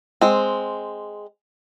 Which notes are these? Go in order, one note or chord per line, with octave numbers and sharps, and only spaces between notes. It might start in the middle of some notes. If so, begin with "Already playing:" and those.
G#3 C4